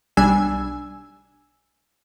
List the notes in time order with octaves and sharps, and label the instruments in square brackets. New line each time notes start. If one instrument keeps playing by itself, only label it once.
[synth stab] B1 G3 D4 G#5 E6